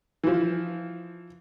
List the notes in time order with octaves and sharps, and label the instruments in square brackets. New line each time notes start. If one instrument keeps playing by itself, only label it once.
[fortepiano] E3 F3